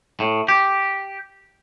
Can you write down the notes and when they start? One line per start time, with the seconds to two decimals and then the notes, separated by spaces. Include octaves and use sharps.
0.20 A2
0.48 G4